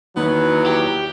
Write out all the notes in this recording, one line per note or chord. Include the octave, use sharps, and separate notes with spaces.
E2 D#3 F#3 A#3 B3 D#4
G4